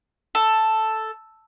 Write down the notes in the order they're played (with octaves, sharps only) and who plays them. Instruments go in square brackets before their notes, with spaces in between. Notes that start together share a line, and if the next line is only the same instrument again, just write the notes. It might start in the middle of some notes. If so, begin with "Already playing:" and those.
[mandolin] A4